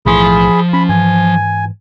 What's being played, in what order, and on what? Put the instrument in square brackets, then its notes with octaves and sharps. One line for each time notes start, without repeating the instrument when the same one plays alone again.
[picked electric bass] B1 A2 E3 [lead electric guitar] F3 C6 [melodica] G#4 B5
[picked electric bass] C#4 [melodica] B5
[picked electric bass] G#2 E3 [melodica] G#5